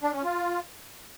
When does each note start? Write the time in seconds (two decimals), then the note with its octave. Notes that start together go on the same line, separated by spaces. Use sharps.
0.01 D4
0.12 C#4
0.23 F4